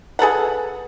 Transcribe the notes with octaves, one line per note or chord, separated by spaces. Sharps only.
G#4 A4 B4 F#5